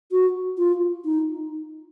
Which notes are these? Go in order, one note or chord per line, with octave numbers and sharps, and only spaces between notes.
F#4
F4
D#4